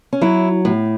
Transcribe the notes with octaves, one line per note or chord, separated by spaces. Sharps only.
C#4
F#3 E4
A2